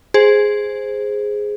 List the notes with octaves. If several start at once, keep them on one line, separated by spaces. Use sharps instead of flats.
G#4 C5